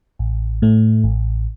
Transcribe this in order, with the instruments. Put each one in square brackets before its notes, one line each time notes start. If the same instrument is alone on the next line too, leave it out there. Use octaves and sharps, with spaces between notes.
[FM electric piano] A1
A2 A3
A1